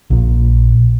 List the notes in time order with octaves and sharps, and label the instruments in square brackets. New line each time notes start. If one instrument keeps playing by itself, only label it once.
[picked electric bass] A#1 A#2